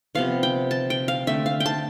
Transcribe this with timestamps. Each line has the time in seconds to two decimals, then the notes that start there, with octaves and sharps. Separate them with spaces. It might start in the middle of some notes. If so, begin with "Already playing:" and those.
0.15 C3 F3 B3 F5
0.43 G5
0.71 A5
0.90 G5
1.08 F5
1.27 D3 A3 C4 E5
1.46 F5
1.60 G5
1.66 A5